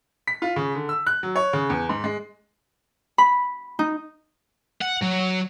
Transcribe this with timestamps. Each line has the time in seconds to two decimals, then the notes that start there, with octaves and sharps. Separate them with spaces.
0.27 B6
0.42 F4
0.56 C#3
0.75 D3
0.89 E6
1.07 F#6
1.23 F#3
1.36 C#5
1.53 C#3
1.70 E2
1.89 G#2
2.04 G#3
3.18 B5
3.79 D#4
4.82 F#5
5.03 F#3